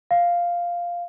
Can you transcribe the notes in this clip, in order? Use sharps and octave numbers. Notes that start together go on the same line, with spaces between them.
F5